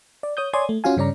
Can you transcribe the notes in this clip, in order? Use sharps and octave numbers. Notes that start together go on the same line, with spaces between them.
D5
C#5 D#6 G6
C#5 D5 G#5 C6 D#6 G#6
A3
C#4 F4 F#4 F5 G#5
G2 C#3 C#4 D5 A#5